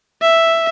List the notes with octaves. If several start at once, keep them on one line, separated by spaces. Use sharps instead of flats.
E5